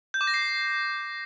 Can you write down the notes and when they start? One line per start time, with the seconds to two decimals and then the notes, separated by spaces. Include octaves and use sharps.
0.14 G6
0.21 D6
0.27 A#6
0.34 C7